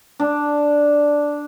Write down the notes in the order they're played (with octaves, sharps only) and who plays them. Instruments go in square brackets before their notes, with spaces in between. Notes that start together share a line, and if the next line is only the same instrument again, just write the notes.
[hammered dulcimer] D4